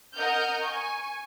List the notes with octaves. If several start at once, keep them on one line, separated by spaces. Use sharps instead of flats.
A#4 D#5 F#5 F6 G6
G#5 C#6